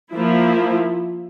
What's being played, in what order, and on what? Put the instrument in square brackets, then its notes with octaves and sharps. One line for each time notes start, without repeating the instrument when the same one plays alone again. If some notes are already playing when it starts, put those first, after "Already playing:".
[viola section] F3 A#3 E4